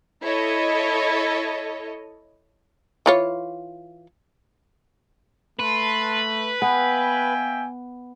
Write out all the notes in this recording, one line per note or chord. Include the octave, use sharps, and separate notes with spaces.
E4 A4 C#5 D#5
E3 F4 C#5
A3 B4 A5 C6
A#3 B3 E5 G5 G#5